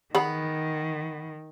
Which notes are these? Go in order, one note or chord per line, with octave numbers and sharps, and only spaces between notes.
D#3 B3 G#4 B5